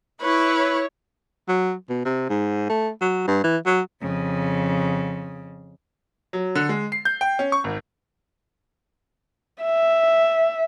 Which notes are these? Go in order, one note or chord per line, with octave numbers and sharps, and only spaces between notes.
E4 B4 C#5
F#3
B2
C3
G#2
A3
F#3
G2
E3
F#3
F2 C#3
F#3
D3
G#3
C7
G6
G5
C#4
C#6
G#1
E5